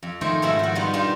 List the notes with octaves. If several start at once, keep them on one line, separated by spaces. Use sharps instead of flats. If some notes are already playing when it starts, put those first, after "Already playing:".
F2
D#3 A3 A#4 C5 C#5 G#5
G#2 B2 F3 E4 E5
D#3 F#4
G3 B3 D#4 F4
D4 D#4 F4 G4 A#4